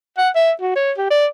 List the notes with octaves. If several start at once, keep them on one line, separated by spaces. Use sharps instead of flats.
F#5
E5
F#4
C#5
G4
D5